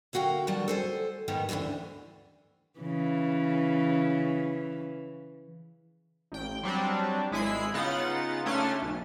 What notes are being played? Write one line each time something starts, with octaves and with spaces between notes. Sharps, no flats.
D3 A#3 F#4 F5 G5
D3 D#3 G3 B3 F#4 A5
A4 C5 G#5
G#2 D#3 G3 G#3 B3 D#4
D2 A2 D3 E3 D4
C#3 E3
A1 G5
F#3 G3 C4 D4
G#1 G#3 E4 G#4 B5 C7
C#3 B3 D#4 F4 F#5 A6
C#3 A3 C#4 D4 C6 A6
B1